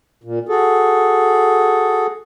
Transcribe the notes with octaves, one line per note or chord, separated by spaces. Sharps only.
A#2
F#4 G#4 A4